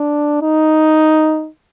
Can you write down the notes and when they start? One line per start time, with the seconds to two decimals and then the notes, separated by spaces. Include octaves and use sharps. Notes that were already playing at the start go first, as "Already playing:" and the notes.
Already playing: D4
0.42 D#4